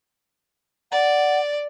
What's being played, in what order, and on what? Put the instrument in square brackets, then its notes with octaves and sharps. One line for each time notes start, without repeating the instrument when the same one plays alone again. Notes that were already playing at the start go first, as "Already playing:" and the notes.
[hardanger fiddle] D5 [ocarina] F#5